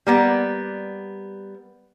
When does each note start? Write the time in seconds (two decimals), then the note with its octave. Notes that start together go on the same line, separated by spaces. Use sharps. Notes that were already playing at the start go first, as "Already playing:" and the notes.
0.07 G3 A#3 B3